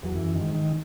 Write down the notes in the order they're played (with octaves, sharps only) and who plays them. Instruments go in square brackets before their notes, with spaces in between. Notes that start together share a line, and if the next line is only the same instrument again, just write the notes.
[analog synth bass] E2 [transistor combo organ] F#3
[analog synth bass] F#2 [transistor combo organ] E3
[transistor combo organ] D#3
[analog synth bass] G#2
[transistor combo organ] D#3